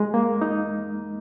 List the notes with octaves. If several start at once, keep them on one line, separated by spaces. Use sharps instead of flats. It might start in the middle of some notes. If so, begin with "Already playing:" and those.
Already playing: G#3
A#3
D#4